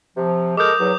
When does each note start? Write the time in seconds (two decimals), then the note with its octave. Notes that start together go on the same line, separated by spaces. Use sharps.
0.16 C3 F3
0.57 G#3 A4 A#4 D6 D#6 G6
0.79 E2 F#3